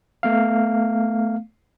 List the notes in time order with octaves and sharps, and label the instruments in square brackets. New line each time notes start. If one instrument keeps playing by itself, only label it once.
[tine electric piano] A3 B3 F5